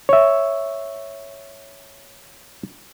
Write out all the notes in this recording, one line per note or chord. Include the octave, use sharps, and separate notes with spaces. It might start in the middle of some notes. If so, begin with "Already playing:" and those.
C#5 E5